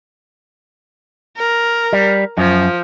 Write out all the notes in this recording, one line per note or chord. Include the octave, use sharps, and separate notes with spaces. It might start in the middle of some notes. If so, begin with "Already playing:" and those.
A#4
G3
F#2 F3